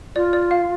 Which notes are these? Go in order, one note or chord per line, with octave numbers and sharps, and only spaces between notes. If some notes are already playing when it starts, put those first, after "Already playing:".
F4 D5
D5
F5